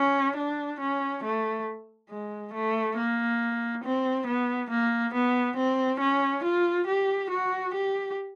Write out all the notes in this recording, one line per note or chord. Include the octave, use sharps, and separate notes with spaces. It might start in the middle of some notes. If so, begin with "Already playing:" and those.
Already playing: C#4
D4
C#4
A3
G#3
A3
A#3
C4
B3
A#3
B3
C4
C#4
F4
G4
F#4
G4